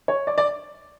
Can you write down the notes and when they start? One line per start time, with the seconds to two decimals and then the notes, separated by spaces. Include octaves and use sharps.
0.08 C#5
0.27 D5
0.38 D5